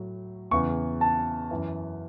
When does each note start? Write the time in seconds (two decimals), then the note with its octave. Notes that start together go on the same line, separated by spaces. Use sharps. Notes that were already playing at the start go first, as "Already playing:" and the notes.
Already playing: A2 F#3
0.51 E2 C#3 E3 C#6
1.01 A5
1.51 F#2 E3